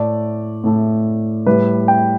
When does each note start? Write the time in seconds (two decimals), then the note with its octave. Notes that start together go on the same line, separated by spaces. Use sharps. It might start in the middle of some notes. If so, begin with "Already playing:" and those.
Already playing: A2 A3 E4 D5
0.64 A2 A3 E4
1.46 A2 G3 E4 B4
1.88 G5